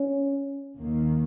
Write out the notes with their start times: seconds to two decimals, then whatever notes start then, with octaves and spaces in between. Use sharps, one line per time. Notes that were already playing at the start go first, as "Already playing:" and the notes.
Already playing: C#4
0.78 D#2 D#3 A#3